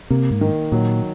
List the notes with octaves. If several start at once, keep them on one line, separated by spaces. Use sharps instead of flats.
C3 A#3
G#2
D#3
A#2 F#3